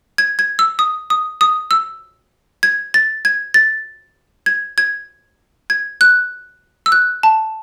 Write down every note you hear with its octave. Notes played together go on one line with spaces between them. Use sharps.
G#6
G#6
E6
D#6
D#6
D#6
E6
G#6
A6
G#6
A6
G#6
G#6
G#6
F#6
E6
F#6
A5